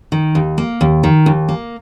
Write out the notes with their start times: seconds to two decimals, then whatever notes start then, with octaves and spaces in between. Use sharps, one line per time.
0.12 D#3
0.35 D#2
0.58 A#3
0.81 D#2
1.03 D#3
1.26 D#2
1.49 A#3